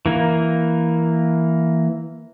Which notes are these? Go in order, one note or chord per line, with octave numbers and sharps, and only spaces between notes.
E3 A#3